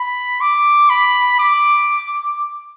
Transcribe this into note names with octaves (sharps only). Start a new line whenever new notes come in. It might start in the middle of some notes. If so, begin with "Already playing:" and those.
Already playing: B5
D6
B5
D6